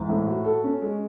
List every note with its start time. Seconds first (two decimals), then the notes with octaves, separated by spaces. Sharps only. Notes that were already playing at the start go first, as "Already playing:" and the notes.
Already playing: G#2 E3
0.09 A2
0.27 F#4
0.44 A4
0.64 C#4
0.82 G#3